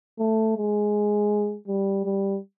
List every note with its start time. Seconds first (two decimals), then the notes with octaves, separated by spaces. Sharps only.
0.19 A3
0.57 G#3
1.67 G3
2.05 G3